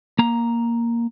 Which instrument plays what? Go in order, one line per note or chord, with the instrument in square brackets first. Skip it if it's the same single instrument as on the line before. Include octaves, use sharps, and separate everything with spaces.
[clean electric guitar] A#3 A#5